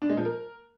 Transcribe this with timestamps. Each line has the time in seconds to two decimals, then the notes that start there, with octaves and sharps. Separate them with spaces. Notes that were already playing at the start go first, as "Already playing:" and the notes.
0.02 D4
0.09 G#3
0.17 F3
0.25 A#4